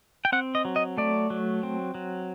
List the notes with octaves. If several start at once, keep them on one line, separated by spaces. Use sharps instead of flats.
G5
C4 F#5
D#5
F#3
D#5
A3 D5
F#3
C4
F#3